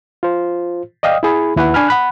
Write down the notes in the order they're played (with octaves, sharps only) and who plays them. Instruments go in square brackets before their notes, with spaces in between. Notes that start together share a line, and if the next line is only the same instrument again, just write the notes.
[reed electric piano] F4 C5
D5 D#5 F5 G5 D#6
E4 G#4 B5
D#2 E4 B4 F#5
D4 G#5 B5 F6
F#5 B5 F#6